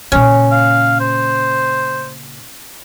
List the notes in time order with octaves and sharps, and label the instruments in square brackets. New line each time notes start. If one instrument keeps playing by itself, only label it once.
[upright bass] A#2 C#3 [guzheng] C#4
[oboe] F5
C5